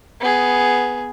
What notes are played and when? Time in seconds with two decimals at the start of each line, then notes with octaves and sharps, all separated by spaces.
0.20 B3 G#4